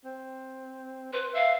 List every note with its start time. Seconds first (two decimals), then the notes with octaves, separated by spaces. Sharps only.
0.05 C4
1.13 B4 C5
1.34 E5 F5